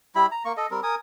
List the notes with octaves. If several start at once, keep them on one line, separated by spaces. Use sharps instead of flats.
G3 E4 B5
A#5
A#3 C#6
A4 D#5
G3 C4 A#4
A#4 G#5 D#6